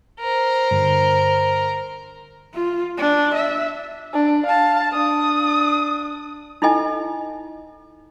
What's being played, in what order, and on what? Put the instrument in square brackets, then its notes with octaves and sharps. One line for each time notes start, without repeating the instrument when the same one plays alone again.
[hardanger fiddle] A#4 C5
[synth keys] G2 D3
[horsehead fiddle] F4
D4
E5
[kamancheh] D4
F5 A5
D4 D#6
[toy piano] D#4 E4 A4 D#5 G#5